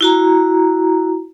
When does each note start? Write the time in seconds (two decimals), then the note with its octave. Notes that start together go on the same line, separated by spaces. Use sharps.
0.01 E4 F#4 A#5